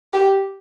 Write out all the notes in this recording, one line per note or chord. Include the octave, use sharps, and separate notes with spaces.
G4